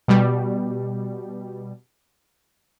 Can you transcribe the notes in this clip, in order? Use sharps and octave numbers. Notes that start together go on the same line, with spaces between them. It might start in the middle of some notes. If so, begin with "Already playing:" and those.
B2 G3